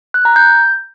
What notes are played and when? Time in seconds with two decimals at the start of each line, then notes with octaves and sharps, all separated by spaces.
0.14 F#6
0.25 A#5
0.36 G6